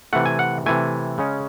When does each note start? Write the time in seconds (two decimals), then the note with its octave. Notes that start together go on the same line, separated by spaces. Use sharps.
0.13 C3 E3 A3 F#5
0.26 G#5
0.39 F#5
0.66 C3 E3 A3 G#5
1.18 C#3 G#3 C#4